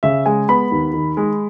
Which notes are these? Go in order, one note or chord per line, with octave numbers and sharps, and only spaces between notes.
C#3 E5
G#3 G#5
B3 B5
D#2
D#3
G#3